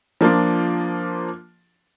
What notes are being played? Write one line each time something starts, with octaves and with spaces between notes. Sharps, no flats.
F3 A#3 D4 F4